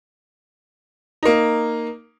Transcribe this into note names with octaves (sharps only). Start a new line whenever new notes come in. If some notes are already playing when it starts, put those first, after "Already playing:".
A#3 D#4